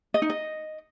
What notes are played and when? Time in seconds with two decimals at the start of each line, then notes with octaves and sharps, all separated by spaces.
0.14 D#5
0.22 D#4
0.30 D#5